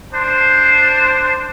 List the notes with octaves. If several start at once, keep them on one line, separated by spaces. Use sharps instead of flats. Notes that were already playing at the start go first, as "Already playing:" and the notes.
D4 C5